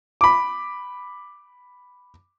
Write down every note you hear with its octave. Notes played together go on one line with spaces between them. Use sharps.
B5 D6